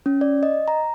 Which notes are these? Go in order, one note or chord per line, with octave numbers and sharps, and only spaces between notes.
C#4
D5
D#5
A#5